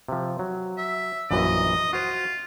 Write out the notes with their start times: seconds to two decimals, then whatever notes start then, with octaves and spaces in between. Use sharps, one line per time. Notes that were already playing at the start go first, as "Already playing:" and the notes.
0.09 C3 F3
0.39 F#3
0.78 E5
1.31 A#1 F#2 E3 D#5
1.93 F4 F#4 C5